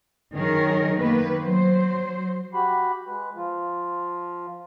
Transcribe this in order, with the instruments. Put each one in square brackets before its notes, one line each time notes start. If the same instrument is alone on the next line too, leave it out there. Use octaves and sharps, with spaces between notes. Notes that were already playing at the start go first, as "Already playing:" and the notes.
[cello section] F#2 D#3 G#4 A#4 C#5
D#3 A#3 B3 B4
F#3 C5
[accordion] F#4 G4 B5
G#3 B4
F3 F4